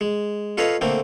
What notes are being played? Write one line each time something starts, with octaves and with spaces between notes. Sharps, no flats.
G#3
F4 A4 B4 C#5 D#5 F5
D3 A3 A#3 C4